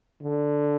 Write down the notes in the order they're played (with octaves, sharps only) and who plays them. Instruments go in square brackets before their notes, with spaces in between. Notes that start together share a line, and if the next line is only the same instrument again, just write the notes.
[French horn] D3